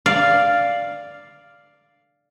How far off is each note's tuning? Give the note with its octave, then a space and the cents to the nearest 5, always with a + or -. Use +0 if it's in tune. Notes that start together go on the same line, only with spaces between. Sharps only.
D5 +0 F5 +0